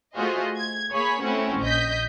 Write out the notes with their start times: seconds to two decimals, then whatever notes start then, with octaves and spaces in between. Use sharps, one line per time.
0.16 A3 F4 F#4 G#4 C5 D#5
0.56 G#6
0.92 A#3 G#4 C#5 B5 B6
1.23 A3 C4 C#4 E4 F#4 F#5
1.60 A#1 D#5 G6 B6